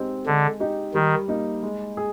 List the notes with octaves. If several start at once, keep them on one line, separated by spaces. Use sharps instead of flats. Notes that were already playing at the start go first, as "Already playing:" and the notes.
Already playing: G#3 C4 D#4 G4
D3 G#3
D#4 G4
D#3 G3
A#3 D#4
G#3
G#4